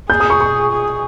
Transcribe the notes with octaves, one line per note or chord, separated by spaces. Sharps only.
G#4 G6
D#6
C#6
C#6
G#4